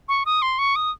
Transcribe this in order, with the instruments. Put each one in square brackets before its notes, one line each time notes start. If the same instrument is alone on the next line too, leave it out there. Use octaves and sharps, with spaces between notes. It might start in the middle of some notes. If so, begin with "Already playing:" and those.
[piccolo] C#6
D#6
C6
C#6
D#6